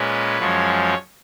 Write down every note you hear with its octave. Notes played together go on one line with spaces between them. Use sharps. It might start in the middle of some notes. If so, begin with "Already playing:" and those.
Already playing: A#2 G#3 C#4 B4
F#2 F3 G#3 C#4 C#5